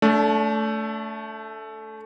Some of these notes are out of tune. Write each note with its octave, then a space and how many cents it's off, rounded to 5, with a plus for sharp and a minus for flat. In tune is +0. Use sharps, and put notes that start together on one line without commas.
A3 +0 D4 -35